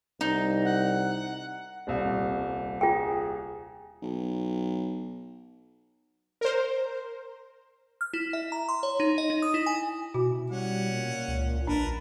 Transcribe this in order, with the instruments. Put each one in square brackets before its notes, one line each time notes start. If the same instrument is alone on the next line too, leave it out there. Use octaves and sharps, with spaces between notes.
[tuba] C2 [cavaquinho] D#4
[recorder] F#5
[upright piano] D#1 C2
[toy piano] F4 G5 [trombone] G#4
[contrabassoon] B1
[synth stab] A#4 C5
[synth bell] F6
E4
E5
A#5
C6
C#5
D#4
D#5
D#4
D#6
E4
G#5
[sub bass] B2 [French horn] E4 [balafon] F#4
[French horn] G3 [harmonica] C#4 F#5
[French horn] A#2
[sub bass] C#2
[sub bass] A#1 [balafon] D4 [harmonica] A#4 B4 A5